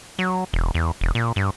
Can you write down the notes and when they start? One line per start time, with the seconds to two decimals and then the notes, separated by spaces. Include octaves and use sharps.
0.19 F#3
0.53 E1
0.75 E2
1.01 E1
1.15 A#2
1.36 G2